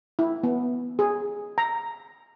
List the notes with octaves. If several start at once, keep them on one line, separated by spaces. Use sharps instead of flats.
E4
B3
G#4
A#5